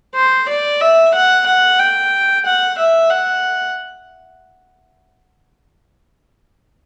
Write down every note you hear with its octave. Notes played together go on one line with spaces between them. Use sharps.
C5
D5
E5
F#5
F#5
G5
F#5
E5
F#5